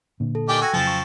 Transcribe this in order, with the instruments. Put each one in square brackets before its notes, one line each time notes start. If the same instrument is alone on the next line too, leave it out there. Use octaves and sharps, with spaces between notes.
[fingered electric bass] A#2 D3
[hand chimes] A4
[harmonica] D#3 G4 D5 [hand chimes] G#5
[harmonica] F#4 G#5 [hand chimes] G5 E6 A#6
[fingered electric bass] F2 C#3 F#3 [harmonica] F3 A5
[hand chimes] C#6